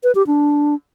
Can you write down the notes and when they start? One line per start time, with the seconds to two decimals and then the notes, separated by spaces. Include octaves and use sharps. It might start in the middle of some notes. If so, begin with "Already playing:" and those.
0.03 B4
0.15 G4
0.27 D4